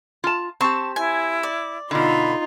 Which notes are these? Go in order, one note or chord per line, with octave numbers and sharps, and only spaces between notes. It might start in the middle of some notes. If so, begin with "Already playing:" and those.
F4 A5
C4 G4 A5 C#6
E4 G#5
D5
B2 D3 D#4 F4 B5